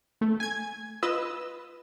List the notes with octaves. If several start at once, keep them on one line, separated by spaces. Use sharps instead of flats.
A3
G#5 G#6
F4 B4 D#5 E6